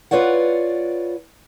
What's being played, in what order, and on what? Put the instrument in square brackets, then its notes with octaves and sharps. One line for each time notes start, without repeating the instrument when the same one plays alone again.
[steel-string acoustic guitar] F4 B4 C#5 D5 F#5